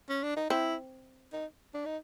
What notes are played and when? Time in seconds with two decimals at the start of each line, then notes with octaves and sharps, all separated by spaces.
0.09 C#4
0.23 D4
0.37 D#4
0.50 C4 E4
1.33 D#4
1.74 D4
1.85 D#4